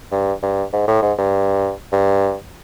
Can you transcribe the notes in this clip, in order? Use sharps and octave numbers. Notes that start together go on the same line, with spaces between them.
G2
G2
G#2
A2
G#2
G2
G2